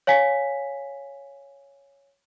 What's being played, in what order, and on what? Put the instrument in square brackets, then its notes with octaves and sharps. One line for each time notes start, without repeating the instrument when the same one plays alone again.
[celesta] C#5 F5 G#5 B6